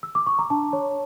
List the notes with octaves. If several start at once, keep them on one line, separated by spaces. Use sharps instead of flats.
E6
D6
C#6
A#5
D4 A5
C#5